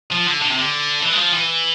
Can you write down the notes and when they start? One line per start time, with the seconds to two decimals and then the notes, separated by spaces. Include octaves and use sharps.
0.12 F3
0.27 D3
0.42 D3
0.50 C3
0.58 D3
1.03 E3
1.12 G#3
1.18 F3
1.33 E3